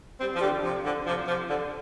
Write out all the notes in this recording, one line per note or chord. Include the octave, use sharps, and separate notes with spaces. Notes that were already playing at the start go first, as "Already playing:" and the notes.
G3 C4
F3
D3 G3
C3 F3
D3
C3 F3
C3 F3
D3